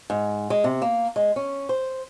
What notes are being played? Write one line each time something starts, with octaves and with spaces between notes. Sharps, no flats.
G#2
G#3
C3
A#3
G#3
C#4
C5